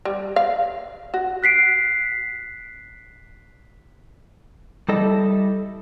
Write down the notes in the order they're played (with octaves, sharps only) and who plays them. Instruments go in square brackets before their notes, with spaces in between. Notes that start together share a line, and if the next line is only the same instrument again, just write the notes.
[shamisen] G3
F5
F#4
[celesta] F#6 B6 C7 D7
[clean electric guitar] G3 E4 A4 D#5